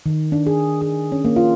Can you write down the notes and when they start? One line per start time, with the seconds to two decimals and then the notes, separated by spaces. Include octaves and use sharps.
0.06 D#3
0.32 D4
0.47 G#4
0.81 G#4
1.12 C#4
1.25 A#3
1.36 F4